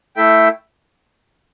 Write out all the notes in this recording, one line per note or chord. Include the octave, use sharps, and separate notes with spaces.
A3 E4 A4 E5 G5